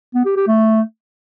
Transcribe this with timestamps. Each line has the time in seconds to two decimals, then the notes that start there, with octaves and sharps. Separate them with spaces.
0.14 B3
0.25 G4
0.36 G4
0.47 A3